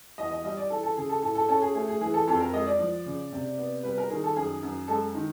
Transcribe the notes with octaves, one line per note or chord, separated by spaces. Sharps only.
E2 D#5
D#5
G3 D#5
D5
E3 A4
A4
C#3 G#4
A4
A2 A4
A4
C#4 A4
G#4
A3 G#4
G#4
E3 G#4
A4
F2 A4
A#4
G#3 D#5
D5
F3
C#3
C3
B3
G3 B4
A#4
D#3 G#4
A4
F#2 G#4
F#2
G#3 A4
D#3